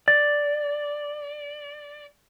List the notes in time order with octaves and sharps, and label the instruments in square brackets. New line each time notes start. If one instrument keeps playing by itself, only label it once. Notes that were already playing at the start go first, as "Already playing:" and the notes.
[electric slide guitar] D5 [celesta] A6